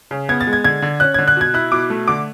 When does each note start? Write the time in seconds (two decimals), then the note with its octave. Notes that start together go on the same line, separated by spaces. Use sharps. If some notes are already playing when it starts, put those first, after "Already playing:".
0.11 C#3
0.29 B3 G#6
0.41 A6
0.47 G#3
0.53 G#6
0.64 D3 G#6
0.82 D3
1.00 C#4 F#6
1.14 D3 G#6
1.28 F#6
1.37 B2 G#6
1.54 E4 F#6
1.72 B2 D6
1.90 A3
2.08 D3 D6